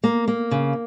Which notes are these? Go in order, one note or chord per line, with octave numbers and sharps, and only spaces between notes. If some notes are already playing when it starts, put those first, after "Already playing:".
A#3
A#3
C#3